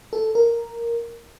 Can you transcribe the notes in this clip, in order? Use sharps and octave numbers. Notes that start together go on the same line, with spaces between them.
A4
A#4